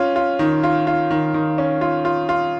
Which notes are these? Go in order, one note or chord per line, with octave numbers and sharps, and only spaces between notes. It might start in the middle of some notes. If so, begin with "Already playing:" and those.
Already playing: C#4 F4
F4
D#3
F4
F4
D#3
D#3
C#4
F4
F4
F4